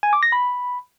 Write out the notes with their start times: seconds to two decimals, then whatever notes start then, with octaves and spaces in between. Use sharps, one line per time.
0.03 G#5
0.13 D6
0.23 A#6
0.32 B5